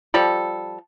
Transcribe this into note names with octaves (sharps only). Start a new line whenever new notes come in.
F3 G3 A4